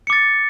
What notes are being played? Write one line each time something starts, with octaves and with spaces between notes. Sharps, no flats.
D6 A6 C#7